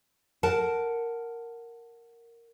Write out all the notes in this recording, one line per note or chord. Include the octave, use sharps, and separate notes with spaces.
A#4 F#5 A5